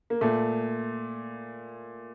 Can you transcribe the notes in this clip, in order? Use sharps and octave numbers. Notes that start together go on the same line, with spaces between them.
A#3
A#2 A3